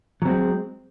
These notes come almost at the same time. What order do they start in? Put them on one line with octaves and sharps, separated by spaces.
F#3 C4 G#3